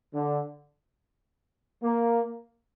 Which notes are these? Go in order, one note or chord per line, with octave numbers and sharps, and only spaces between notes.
D3
A#3